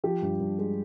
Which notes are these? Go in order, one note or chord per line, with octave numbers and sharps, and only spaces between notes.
F3 G4
G2
G2
G#3